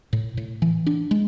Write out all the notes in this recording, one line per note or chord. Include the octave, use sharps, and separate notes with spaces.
A2
A2
E3
D4
G#3